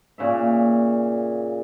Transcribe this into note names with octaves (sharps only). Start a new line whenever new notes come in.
A#2 C#3 C#5 E5